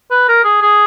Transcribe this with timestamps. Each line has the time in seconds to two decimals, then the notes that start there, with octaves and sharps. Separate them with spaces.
0.11 B4
0.28 A#4
0.44 G#4
0.62 G#4